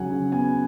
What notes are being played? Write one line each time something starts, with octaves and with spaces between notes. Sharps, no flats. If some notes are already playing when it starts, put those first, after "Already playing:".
Already playing: F#2 C#3 F#3 F#5 G#5
C#3
B3 G#5